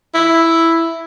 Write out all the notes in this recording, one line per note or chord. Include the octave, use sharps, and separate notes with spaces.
E4